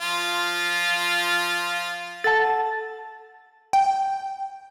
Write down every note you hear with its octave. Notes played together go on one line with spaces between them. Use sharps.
F3 F4
A4 F#5 A5 A6
G5